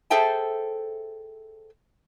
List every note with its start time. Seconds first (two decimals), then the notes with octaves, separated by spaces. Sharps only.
0.10 G#4 A4 C5 E5 G5 A5